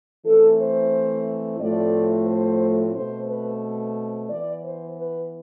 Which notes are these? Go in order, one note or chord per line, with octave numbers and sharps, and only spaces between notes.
E3 A3 C4 A4
C5
A2 F3 A3 C4 D5
C5
B2 A3 C4 C5
B4
E3 B3 D5
C5
B4